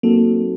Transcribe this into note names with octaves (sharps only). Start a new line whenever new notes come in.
F#3 A#3 C4 D#4 F#4 A4